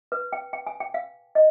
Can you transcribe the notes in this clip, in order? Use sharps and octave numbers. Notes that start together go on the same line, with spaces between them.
B4
G5
G5
G#5
G5
F5
D#5